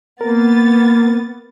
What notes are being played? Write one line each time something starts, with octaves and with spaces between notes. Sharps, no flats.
A#3 B3 A#4 A6